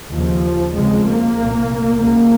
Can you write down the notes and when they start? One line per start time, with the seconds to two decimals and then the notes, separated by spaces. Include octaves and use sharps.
0.13 D#2 C#3 F3
0.75 F2 C#3 G#3
1.07 A#3
1.37 C2 A#2
2.00 C#2 C#3 A#3